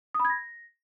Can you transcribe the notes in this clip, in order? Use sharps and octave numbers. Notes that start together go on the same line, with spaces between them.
D#6
B5
G#6
A#6